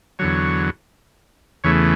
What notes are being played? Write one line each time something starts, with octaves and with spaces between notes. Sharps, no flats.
E2 D3 F#3 C#5
E2 C#3 E3 A3 C#5